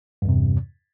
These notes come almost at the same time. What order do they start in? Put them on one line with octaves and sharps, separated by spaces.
G2 E2 C3